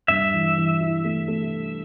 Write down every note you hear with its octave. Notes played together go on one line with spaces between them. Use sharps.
G2 E5
E3
E3
E4
A3
A3